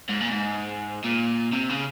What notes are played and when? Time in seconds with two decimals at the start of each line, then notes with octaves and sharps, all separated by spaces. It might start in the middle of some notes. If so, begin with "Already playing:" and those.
0.09 G#2
0.21 A#2
0.31 G#2
1.05 A#2
1.53 C3
1.69 C#3